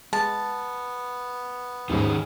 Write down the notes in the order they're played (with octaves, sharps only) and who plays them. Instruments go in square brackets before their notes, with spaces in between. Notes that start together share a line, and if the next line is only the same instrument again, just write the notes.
[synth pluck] G#3 [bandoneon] B3 [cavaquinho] A5
[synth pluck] D#2 G#2 [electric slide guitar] D#3 C#4 G#4